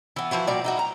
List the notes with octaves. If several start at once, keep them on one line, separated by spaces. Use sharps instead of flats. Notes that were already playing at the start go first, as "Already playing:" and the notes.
E3 B3
E3 F3 E4 F#4
A#2 G3 F#4 D5
D#4 E4 F#4
A#5